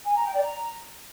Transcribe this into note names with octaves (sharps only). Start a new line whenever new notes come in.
G#5
A#5
G5
D5
A#5